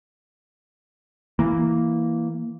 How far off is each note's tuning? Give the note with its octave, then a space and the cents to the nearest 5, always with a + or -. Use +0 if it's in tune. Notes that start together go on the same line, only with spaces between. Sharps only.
E3 +0 A#3 +0